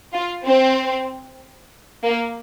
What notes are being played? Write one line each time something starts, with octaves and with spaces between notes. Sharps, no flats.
F4
C4
A#3